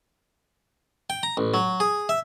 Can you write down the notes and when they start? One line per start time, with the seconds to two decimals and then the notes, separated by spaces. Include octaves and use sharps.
1.10 G5
1.23 A#5
1.37 A1
1.54 F#3
1.80 G#4
2.09 E5